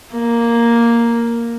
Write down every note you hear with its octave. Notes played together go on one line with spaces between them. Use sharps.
A#3